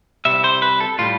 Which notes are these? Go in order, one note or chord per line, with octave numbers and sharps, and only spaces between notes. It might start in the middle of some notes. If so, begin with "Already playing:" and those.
C2 C3 G3 E5
C5
B4
A4
A2 G3 F4